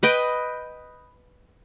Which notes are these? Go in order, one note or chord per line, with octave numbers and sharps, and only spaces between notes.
B4 D#5 G5